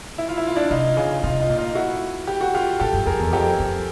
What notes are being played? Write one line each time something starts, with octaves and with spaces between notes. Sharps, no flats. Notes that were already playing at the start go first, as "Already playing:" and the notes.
E4
F4
E4
F4
D4 E4
C3 D#4 F4
C#3
C3 D#4 F4
D#4 F4
A#2
D#4 F4
E4 F#4
G4
F#4
F4 G4
A#2 G4 A4
F#2
F2 G#4 A#4
E2
F2 G4 A4
F2